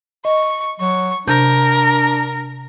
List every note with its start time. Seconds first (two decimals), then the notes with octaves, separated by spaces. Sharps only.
0.25 D#5 C#6
0.80 F#3 C#6
1.28 C3 D4 A#4 G6